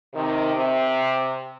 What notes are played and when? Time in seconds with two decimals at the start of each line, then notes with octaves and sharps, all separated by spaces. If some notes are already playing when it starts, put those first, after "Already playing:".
0.14 C3 D#3
0.55 C3